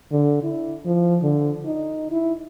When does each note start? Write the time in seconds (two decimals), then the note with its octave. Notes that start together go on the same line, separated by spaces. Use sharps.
0.12 D3
0.43 E4
0.86 F3
1.23 D3
1.66 D#4
2.12 E4